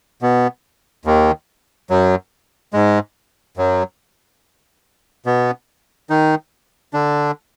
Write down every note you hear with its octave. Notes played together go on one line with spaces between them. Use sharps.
B2 B3
D#2 D#3
F#2 F#3
G#2 G#3
F#2 F#3
B2 B3
D#3 D#4
D3 D4